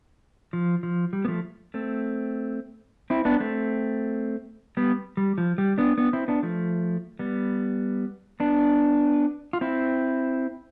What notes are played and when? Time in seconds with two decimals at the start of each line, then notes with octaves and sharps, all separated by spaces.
0.53 F3
0.83 F3
1.13 G3
1.25 B3
1.28 F3 A3
1.74 A3 C4
3.10 C4 E4
3.25 B3 D4
3.40 A3 C4
4.77 G3 B3
5.17 G3
5.38 F3
5.58 G3
5.78 B3 D4
5.98 B3 D4
6.13 C4 E4
6.28 B3 D4
6.43 F3 A3
7.19 G3 B3
8.40 B3 D4
9.53 F4
9.61 C4 E4